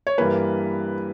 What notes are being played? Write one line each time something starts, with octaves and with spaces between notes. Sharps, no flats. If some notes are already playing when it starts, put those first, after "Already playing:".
C#5
G2 E3 A#3 B4